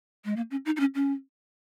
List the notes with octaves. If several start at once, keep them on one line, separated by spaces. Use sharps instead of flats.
G#3
A#3
C#4
D#4
D#4
C#4
C#4